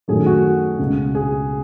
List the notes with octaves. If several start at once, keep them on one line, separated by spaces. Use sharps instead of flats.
F#2 D#3 F#3 A3 G#4
F#4
C#2 B2 G#3
G#4